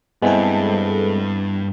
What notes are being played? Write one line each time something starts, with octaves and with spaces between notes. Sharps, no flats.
G2 G#3 B3 C4 E4 A4